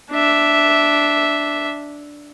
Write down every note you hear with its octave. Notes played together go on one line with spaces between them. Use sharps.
D4 E5